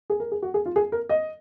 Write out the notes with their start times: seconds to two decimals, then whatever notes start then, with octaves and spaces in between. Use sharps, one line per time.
0.10 G#4
0.20 A#4
0.32 G#4
0.42 F#4
0.54 G#4
0.66 F4
0.76 G#4
0.92 A#4
1.09 D#5